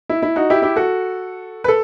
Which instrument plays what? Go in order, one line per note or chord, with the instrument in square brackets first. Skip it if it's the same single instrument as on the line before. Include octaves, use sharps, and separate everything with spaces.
[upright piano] E4
E4
D#4 F#4
E4 G4
E4 G4
F#4 A4
B4
A4